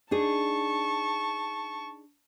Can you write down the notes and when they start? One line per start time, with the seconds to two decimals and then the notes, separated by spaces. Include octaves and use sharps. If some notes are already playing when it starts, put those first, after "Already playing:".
0.11 D4 D#4 G#4 A5 C#6